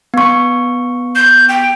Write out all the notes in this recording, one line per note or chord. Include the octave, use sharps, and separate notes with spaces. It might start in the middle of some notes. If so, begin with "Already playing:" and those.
B3 C#6
G6
G5